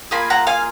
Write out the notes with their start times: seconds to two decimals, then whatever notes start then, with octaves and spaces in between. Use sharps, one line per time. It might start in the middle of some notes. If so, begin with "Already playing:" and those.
0.11 A#3 F4 G#4 G#5 B5
0.30 F#5 A#5
0.47 F5 G#5